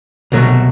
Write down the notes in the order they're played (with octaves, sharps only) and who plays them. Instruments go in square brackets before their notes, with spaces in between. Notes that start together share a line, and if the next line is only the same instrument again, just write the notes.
[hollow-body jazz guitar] C2 B2 F#3 A3